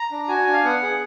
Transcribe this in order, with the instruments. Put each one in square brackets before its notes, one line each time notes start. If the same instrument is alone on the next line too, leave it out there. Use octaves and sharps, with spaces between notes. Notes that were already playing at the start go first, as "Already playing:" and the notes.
Already playing: [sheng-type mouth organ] A#5
D4
F#4 G#5
D4
F5
B3 F#5
G#4